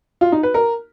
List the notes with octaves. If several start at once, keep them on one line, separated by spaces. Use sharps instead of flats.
F4
D#4
B4
A#4